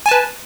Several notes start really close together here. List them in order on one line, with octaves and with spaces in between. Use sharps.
G#5 A5 B4